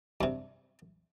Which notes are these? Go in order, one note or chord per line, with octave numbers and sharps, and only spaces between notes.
G2 C3